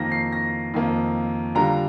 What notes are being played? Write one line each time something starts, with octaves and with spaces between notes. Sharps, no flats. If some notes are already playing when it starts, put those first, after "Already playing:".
Already playing: F2 D#3 A#3 A#6
C7
A#6
F2 D#3 A#3
D3 G3 D4 F4 A#5